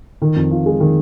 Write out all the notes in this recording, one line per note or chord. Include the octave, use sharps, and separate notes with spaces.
D#3
F2
F4
G#3
D#3